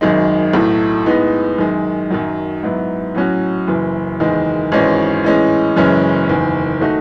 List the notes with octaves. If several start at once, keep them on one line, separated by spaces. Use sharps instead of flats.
G#1 F#2 D#3 G#3
B1 A2 F#3 A3
A2 G#3 B3 D#4
F#2 D#3 G#3
F#2 D#3 F#3
G#2 F#3 B3 E4
A2 F#3 C#4 F#4
F#1 F#2 E3
F#1 E2 D#3 G#3
G#1 G#2 E3 G#3 C#4
A2 E3 G#3 C#4
F#1 F#2 E3 G#3 C#4
F#1 E2 D#3
D#3 A3 D#4 F#4